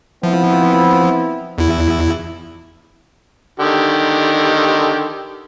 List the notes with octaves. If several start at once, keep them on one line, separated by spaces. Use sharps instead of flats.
F3 B3 C4 E4
E2 E4
D3 D#3 G4